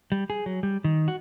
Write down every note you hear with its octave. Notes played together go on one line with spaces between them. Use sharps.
G3
G#4
F#3
G3
D#3
F#4